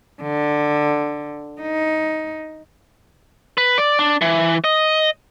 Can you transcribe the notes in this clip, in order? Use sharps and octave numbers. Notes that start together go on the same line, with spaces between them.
D3
D#4
B4
D5
D4
E3
D#5